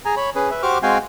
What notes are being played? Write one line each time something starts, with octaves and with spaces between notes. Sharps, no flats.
G#4 G#5 A#5
C#5 B5
C#4 G#4 B4
B4 E5
F#4 G4 C5 C#6 D6 F6
G#3 C4 F#4 F5 G5 G#5